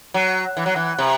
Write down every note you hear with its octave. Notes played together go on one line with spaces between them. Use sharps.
F#3
E3
F#3
E3
C3